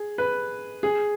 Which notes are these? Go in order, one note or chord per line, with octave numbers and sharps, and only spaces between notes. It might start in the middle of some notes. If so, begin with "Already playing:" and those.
Already playing: G#4
B4
G#4